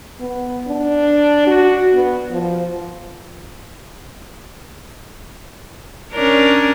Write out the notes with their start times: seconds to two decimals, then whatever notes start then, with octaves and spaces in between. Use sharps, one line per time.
0.20 B3
0.68 D4
1.47 F#4
1.94 B3
2.30 F3
6.13 C#4 D4 A#4